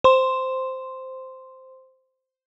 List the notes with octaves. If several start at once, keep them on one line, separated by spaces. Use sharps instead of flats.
C5 C6